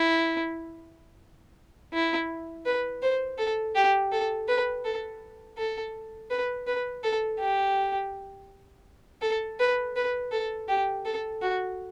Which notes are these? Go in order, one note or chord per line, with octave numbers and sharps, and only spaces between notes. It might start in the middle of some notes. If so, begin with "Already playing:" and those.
Already playing: E4
E4
B4
C5
A4
G4
A4
B4
A4
A4
B4
B4
A4
G4
A4
B4
B4
A4
G4
A4
F#4